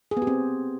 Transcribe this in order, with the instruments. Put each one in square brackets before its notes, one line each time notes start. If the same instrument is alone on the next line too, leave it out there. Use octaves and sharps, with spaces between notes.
[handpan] G#4
B3
G4
C4